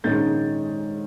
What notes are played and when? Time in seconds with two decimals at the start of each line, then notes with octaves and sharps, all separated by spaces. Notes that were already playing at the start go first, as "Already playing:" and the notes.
0.04 A#1 G#2 D#3 G#3 C#4 G6 A6